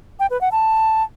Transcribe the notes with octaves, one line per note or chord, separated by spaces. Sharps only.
G5
B4
F#5
A5